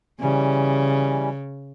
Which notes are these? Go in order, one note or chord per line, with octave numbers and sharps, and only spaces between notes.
C#3 E3 G3 C#4